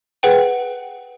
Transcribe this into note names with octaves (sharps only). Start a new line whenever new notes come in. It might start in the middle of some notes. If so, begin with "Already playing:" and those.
G#4 B4 F#5 G5